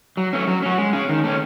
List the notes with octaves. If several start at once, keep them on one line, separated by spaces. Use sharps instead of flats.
F#3
A3 C#4
F#3
C#4 F#4
G#3
C#4 G#4
D#3
A3 C#4